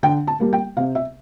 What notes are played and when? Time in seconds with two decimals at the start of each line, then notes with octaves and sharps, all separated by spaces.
0.03 D3 G5
0.27 A5
0.40 G3 A#3
0.53 G5
0.77 C3 F5
0.95 E5